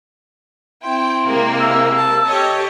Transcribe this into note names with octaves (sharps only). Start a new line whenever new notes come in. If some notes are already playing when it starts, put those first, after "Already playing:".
C4 E4 G5 C6
C3 G#3 A#3
E6
A5
G4 A4 C#5 D#5